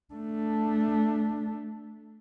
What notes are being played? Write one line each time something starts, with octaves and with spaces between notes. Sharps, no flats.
A3 D4